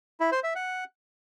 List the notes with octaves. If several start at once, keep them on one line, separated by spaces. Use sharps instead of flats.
E4
C5
E5
F#5